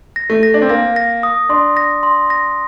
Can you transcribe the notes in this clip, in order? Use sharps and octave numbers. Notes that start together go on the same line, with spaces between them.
A#6
A3
A#6
D4
C4
A#3 A#6
A#6
D#6
D4 C6
A#6
C6
A#6